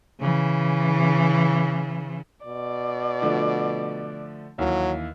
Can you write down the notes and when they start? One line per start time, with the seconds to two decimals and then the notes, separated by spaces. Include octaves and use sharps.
0.21 C#3 E3
2.46 B2 D5
3.22 D3 F3 A3
4.58 D#2 E3 F#3